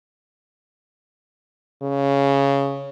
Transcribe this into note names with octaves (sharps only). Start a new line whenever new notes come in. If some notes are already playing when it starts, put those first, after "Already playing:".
C#3